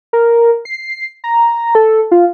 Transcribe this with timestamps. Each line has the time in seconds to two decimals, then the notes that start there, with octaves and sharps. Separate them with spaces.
0.13 A#4
0.65 C7
1.24 A#5
1.75 A4
2.11 F4